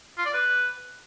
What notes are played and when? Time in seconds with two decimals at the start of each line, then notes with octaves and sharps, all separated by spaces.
0.18 F4
0.26 D5
0.34 B4